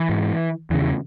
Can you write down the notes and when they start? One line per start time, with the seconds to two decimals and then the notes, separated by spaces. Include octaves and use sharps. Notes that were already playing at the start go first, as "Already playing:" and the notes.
Already playing: E3
0.09 G#2
0.70 E2 E3
0.74 C#3
0.81 E3